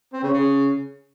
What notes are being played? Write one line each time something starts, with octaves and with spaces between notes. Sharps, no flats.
C4
C#3
C#3